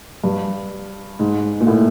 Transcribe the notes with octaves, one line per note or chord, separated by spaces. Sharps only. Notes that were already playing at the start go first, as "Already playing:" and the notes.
G2
G#2
A#2
A2